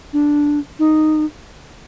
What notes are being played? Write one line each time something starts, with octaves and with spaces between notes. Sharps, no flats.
D4
D#4